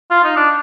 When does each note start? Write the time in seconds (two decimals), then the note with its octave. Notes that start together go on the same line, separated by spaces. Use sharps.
0.10 F4
0.24 D#4
0.36 D4